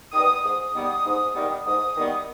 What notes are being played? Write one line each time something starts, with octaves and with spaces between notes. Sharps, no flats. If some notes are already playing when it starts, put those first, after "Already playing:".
D#3 G3 B3 D#6
G#2 D#6
D#3 G3 B3
G#2
D#3 G3 B3
G#2 D#6
D#3 G3 B3